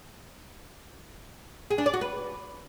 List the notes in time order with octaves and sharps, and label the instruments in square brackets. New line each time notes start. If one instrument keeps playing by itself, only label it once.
[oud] G#4
D4
D5
F#4
B4